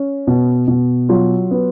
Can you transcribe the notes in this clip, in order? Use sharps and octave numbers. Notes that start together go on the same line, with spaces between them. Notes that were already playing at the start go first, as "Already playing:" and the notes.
Already playing: C#4
B2
B2
F#3 F4
B3